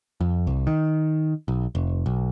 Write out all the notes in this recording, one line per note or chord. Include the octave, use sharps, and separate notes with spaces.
F2
C2
D#3
B1
F1
B1